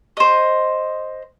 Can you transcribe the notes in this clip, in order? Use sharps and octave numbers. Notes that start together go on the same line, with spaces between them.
C5 D#5